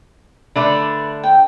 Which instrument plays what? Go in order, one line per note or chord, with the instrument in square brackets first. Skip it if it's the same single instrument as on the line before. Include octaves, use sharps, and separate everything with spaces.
[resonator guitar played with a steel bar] D3 A3 D4 [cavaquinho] B4
[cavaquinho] G5